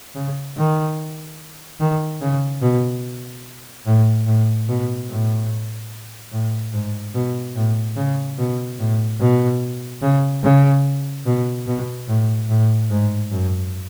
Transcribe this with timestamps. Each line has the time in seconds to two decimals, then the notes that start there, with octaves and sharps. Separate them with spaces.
0.15 C#3
0.57 D#3
1.80 D#3
2.21 C#3
2.62 B2
3.86 A2
4.27 A2
4.68 B2
5.09 A2
6.32 A2
6.73 G#2
7.15 B2
7.56 A2
7.96 C#3
8.38 B2
8.79 A2
9.20 B2
10.02 C#3
10.43 C#3
11.26 B2
11.67 B2
12.08 A2
12.49 A2
12.90 G#2
13.31 F#2